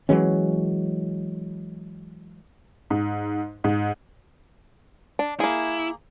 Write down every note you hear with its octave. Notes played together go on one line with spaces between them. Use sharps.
E3 F#3 G#3 C#4
G#2
G#2
D4
A#3 E4 G#4